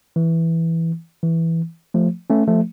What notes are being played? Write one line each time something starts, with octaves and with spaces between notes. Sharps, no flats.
E3
E3
F3 A3
A3 C#4
F3 A3